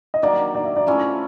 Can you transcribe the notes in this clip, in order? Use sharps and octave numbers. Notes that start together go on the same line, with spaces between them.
D#5
D#3 F#3 A#3 D4 D5
D5
E5
D5
F3 A3 C#4 E4 D5